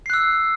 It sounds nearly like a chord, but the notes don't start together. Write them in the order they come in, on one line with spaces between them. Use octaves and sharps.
C7 F#6 E6